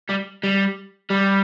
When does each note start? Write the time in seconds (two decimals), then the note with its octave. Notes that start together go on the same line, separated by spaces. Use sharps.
0.09 G3
0.43 G3
1.10 G3